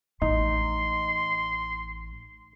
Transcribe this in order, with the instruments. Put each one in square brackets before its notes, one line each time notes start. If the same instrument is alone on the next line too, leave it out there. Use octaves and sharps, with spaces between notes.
[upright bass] A1 A3 [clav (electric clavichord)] D#4 [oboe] C6